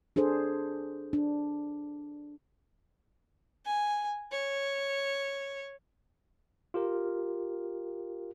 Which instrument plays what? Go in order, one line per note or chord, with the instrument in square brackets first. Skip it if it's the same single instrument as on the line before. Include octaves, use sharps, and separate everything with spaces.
[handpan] D4 G#4 A4 C5
D4
[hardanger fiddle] G#5
C#5
[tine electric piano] F4 G4 A#4